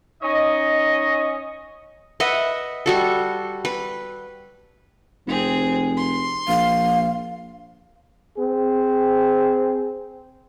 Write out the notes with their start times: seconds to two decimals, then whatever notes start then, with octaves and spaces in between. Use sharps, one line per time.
0.23 C#4 D#4 C#5 D#5
2.20 B4 D#5 E5 F#5
2.86 G3 F#4 A4
3.65 B4
5.27 F1 C4 G#4
5.97 C6
6.48 A#1 F5
8.38 C4 G#4